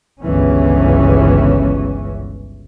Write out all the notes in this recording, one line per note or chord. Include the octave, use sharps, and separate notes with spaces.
G1 C#2 E3 C#4